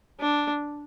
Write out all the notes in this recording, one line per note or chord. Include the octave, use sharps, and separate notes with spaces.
D4